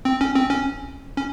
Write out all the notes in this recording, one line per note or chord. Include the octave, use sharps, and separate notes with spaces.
C4
C#4
C4
C#4
C#4